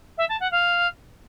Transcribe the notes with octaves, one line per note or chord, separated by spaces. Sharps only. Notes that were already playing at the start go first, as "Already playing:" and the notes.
E5
A5
F#5
F5